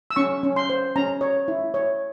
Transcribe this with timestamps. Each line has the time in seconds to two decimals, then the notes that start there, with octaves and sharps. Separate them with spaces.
0.11 E6
0.16 C#4 C#6
0.43 C#4
0.56 C6
0.70 C5
0.96 C#4 A#5
1.21 C#5
1.48 E4
1.74 C#5